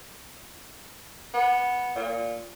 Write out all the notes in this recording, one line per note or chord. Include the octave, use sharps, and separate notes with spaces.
B3
A#2